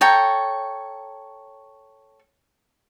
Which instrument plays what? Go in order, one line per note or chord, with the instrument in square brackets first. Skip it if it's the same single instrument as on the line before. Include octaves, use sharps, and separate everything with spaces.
[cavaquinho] A4 C#5 G5 A#5